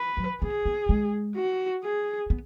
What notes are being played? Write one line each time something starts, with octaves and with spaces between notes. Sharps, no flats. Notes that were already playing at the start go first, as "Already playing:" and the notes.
Already playing: B4
F#3
B3 G#4
B3
G#3
F#4
G#4
B3